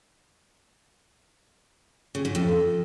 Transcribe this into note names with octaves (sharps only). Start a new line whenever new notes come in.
C#3
G#2
F2